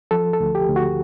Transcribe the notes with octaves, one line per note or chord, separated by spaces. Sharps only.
F3 A4
A4
D2
G4
D2
F#4